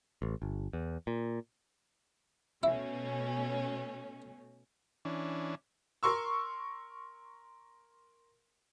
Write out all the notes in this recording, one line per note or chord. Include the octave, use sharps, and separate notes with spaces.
A1
G1
E2
A#2
B2 A3 C#4 E4
E3 C#4 D4
A#4 C6 C#6 E6